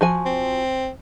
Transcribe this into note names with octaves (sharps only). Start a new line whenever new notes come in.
F3 F#4 G#5
C4